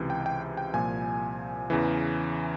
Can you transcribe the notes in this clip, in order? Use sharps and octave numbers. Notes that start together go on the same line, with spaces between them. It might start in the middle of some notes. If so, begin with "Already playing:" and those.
Already playing: C#2 C3 E3
G5
G5
G5
C2 A#2 F3 G#5
E2 C#3 E3